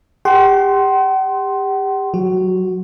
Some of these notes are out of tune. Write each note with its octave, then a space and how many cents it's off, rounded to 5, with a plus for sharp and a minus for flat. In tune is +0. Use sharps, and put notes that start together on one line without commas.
G4 +30 F#5 +45 C6 +5
F#3 +0 F#4 +0